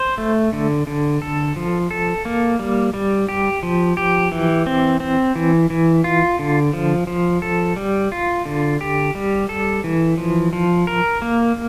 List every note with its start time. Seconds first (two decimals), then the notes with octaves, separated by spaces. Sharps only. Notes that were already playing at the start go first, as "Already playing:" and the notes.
Already playing: C5
0.18 A3
0.53 D3
0.87 D3
1.22 A4
1.56 F3
1.91 A4
2.25 A#3
2.59 G3
2.94 G3
3.29 G4
3.63 F3
3.97 G4
4.32 E3
4.67 C4
5.00 C4
5.36 E3
5.70 E3
6.04 F4
6.39 D3
6.73 F3
7.07 F3
7.42 A4
7.76 G3
8.12 F4
8.45 D3
8.81 G4
9.15 G3
9.49 A4
9.84 E3
10.18 F3
10.53 F3
10.87 A#4
11.22 A#3